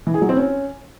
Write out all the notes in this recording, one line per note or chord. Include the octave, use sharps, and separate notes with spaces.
E3
G#4
F#3
C4
C#4